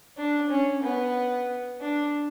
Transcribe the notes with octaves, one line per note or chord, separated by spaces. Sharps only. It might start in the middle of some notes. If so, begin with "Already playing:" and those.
D4
C#4
B3
D4